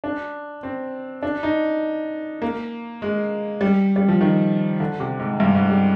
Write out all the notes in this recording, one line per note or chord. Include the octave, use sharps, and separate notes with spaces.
D4
C4
D4
D#4
A#3
G#3
G3
G3
F3
D#3
D3
C3
G#2
G2
G#2
G3